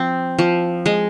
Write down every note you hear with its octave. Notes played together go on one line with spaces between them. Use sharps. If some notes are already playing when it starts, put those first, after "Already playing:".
Already playing: F3 C4
F3
G#3